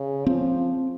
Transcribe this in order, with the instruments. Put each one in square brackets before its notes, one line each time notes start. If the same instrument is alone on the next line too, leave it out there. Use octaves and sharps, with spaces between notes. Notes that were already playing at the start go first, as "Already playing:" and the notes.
Already playing: [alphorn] C#3
[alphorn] F3 [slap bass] C4